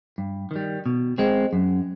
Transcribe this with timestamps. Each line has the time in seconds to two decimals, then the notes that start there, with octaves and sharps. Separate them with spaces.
0.18 G2
0.51 D#3 G3
0.86 B2
1.18 G#3 C4
1.53 F#2